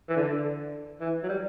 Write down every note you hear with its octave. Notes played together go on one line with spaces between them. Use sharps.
E3
D3
E3
F#3
G3